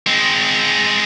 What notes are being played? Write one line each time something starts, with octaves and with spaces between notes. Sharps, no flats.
G#3 C4